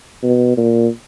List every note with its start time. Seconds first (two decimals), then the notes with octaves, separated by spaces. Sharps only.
0.23 B2
0.57 A#2